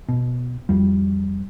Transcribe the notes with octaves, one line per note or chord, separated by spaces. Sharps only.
B2
F2 G3